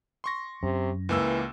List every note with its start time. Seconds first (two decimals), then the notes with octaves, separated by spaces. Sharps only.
0.24 C6 C#6 A#6
0.63 F#2 C3
1.09 C#2 E3 A#3 E6